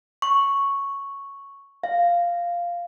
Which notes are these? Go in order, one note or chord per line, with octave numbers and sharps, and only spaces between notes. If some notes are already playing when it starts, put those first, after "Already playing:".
C#6
F5